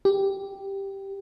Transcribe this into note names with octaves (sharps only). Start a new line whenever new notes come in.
G4